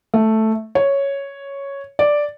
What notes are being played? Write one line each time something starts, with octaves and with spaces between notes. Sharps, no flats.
A3
C#5
D5